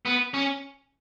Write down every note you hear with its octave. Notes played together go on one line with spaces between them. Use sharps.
B3
C#4